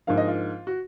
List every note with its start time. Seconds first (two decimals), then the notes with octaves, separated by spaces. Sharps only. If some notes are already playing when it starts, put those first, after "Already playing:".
0.07 G#2 F3 A#3 D4 F5
0.18 D#5
0.28 F4
0.67 F#4